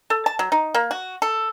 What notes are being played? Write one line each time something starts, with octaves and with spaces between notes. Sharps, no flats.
A4
A5
F#3
D#4
A#3
F#4
A4